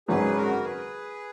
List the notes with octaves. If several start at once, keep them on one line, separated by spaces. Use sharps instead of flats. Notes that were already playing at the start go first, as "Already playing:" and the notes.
G#1 F#2 C#3 F#3 G#4 B4
F#4 A#4
G#4 B4